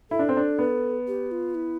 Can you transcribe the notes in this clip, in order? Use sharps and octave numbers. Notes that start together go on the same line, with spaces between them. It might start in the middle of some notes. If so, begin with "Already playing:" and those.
E4 A4
D4
C4
D4
B3
G4
F4
E4